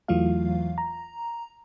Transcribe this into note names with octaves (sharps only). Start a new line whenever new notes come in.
E2 E3 F#3 A3 F4 F5
A#5